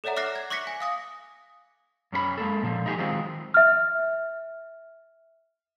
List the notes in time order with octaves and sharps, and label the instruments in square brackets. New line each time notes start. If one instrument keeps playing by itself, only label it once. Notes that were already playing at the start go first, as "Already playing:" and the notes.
[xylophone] A4 C#5 D5 E5 F#5 A#5
E5 D6 F6 F#6 A#6 C7
G#6
C#6 D6 F#6 A#6 B6 C#7
G#5
F5 D#6 A#6
[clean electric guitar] F#2 C#4 A#4 B5
G#3 A#3 A4
A#2 D3 F3
D#4 E4 G4 G#4
D#3 F#3 G#3 C4 F4
[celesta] E5 F6